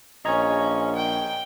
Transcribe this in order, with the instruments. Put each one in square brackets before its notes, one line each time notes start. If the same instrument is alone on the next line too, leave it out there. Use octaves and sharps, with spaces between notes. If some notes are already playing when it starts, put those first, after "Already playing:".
[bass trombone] A#1 [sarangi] C#4 [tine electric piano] D#5 A#5 G#6
[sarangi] G5